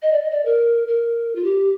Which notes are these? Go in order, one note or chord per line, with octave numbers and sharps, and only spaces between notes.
D#5
D5
D#5
D5
A#4
A#4
F4
G4